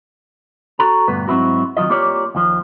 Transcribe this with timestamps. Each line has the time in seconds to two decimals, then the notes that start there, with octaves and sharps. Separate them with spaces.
0.79 F#4 A4 A#5
1.08 D2 G2 A#2 B3 B4
1.28 G#2 F#3 C4 E4 F#4
1.77 D#3 F#3 G#3 F4 D#5
1.90 A#3 F4 G4 C#5 D5
2.35 D#2 F3